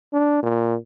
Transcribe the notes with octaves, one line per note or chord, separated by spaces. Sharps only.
D4
A#2